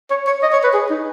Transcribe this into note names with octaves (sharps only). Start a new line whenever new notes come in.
C#5
C#5
D#5
C#5
B4
G#4
D#4